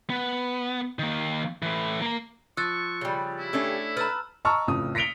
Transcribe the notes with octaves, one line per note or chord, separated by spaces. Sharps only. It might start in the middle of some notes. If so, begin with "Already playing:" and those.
B3
D#3 A#3
A2 E3
A#3 A#5
F3 C#6 E6 F#6 A6
C#3 G3
E4
A3 C#4 D4
B4 A5 A#5 E6 F6
D#5 A5 A#5 C#6 E6 F6
A1 F2 C#3 D#6
A#6 B6 C#7 D7 F7 G7